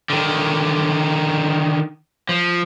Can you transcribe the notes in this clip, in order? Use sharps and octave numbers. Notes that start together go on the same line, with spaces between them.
D3 D#3
F3